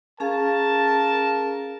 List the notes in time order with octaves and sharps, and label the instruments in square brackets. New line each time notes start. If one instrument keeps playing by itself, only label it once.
[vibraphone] C#4 G#4 F5 [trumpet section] A#4 A5